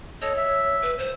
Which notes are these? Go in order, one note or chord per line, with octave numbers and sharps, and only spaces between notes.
A4 C#5 D#5
E5
B4
C5